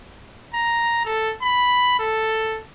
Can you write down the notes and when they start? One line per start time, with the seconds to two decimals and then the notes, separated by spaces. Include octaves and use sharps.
0.54 A#5
1.05 A4
1.42 B5
2.00 A4